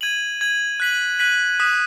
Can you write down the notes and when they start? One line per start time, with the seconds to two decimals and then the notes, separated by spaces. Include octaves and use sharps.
0.01 G#6 D#7 F#7
0.41 G#6 D#7 F#7
0.80 F#6 B6 D#7 F#7
1.19 F#6 B6 D#7 F#7
1.59 D#6 F#6 B6 E7